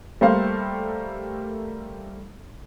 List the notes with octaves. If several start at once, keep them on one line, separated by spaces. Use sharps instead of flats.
G3 A3 A#3 C5 F5